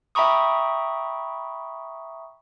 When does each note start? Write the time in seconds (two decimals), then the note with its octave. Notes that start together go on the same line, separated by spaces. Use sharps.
0.15 E5 G5 A#5 B5 C#6 D#6